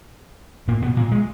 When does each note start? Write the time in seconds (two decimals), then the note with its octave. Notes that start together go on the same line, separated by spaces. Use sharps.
0.68 A#2 A#3
0.82 B2 B3
0.97 A#2 A#3
1.12 G#3